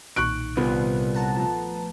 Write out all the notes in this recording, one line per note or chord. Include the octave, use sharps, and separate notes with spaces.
B1 A#2 D#3 C#6 F#6 D7
C2 B3 F4 B4
F#5 A5 A#5
F3 A3 A5